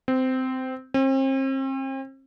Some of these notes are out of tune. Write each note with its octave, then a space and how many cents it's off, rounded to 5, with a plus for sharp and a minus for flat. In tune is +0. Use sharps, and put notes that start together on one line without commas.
C4 -15
C4 +40